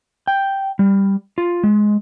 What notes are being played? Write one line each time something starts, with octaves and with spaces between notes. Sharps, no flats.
G5
G3
F4
G#3